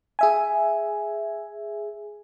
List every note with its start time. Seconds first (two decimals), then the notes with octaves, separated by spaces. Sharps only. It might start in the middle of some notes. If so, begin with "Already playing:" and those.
0.19 G#4 E5 G#5